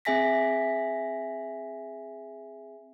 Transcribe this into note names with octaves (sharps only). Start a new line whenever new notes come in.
C4 G#4 E5 G#5 A#6 B6